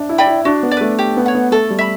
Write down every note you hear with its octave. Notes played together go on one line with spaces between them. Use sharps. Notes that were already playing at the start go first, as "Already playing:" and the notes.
Already playing: D4 E5
E4
D5 G5 B5
E4
D4 F#4
B3
D5
A3 B4
G4
B3
C#5 F#5
B3
A3 A4
G3
E5 B5